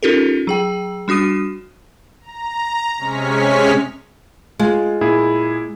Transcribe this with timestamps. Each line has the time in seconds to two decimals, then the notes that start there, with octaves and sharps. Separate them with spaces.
0.03 C#4 D#4 F4 G4 A4 A#4
0.47 F#3 G#4 G5
1.08 G3 D4 F#4 D#6 D#7
2.21 A#5
2.98 C3 G#3 C#4 C#6 F6 B6
4.59 G#3 F4
5.01 A#2 E4 G#4